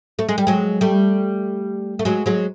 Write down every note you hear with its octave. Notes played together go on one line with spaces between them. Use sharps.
A3
G#3
G3
F#3 G#3
G3 A3
A3
F#3 G#3
F#3 G#3